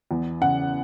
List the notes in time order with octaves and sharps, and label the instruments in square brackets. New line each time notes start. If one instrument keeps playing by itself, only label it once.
[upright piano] E2
C#3 F#5